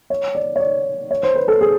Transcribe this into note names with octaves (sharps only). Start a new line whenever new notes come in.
C#5
D5
C#5
D5
C#5
C5
B4
A4
G#4